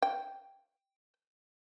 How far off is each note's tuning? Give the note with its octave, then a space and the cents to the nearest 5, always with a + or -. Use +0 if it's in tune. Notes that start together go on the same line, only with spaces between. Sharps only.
G5 -5